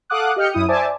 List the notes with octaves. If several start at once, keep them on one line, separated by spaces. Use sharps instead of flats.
A4 F5 F#5 D6 D#6 F#6
G4 D#5 F6 G6 C#7
F#2 E4 D#6
C5 D5 E5 G#5 A5 D6